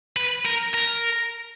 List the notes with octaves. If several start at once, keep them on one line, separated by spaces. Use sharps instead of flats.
B4
A#4
A#4